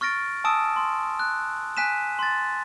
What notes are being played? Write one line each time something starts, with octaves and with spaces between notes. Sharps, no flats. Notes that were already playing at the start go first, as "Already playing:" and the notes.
C#6 F6 A6 A#6 D7
G#5 A5 D#6 E6 D7 E7
C6
F#6
G#5 F#6 B6 D#7 E7
C6 A6